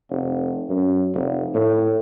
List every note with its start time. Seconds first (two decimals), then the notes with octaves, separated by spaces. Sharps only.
0.10 F1
0.70 F#2
1.14 F1
1.55 A2